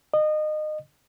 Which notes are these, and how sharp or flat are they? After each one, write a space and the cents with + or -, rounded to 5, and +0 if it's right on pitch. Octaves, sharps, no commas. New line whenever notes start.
D#5 -25